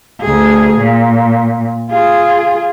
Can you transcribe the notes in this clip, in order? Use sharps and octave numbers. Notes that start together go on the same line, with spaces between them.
D2 G#4
A#2
F4 G#4